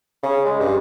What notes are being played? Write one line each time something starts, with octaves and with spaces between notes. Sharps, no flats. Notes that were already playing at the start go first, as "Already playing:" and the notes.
C#3
G#3
G2